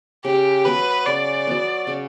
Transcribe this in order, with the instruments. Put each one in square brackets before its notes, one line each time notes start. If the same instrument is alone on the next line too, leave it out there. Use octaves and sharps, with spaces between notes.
[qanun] C#3 [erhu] G4
[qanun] F#3 B3 [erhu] B4
[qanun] C#3 [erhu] D5
[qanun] F#3 B3
C#3